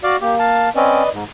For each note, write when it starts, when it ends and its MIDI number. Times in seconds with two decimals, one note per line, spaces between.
0.03 0.17 66
0.03 0.16 74
0.03 0.16 77
0.21 0.69 58
0.21 0.35 67
0.39 0.69 77
0.39 0.69 81
0.76 1.03 60
0.76 1.03 61
0.76 1.09 71
0.76 1.09 74
0.76 1.09 75
1.13 1.24 44